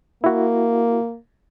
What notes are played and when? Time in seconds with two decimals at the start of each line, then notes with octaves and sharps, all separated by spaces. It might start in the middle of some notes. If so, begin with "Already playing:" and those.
0.24 A#3 E4 F#4